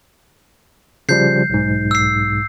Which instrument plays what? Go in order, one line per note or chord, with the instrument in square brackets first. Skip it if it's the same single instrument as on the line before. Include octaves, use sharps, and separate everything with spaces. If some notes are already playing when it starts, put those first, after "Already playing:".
[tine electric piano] C#3 F3 G3 [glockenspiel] G6 C7
[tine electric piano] B1 G#2
[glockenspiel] E6 C7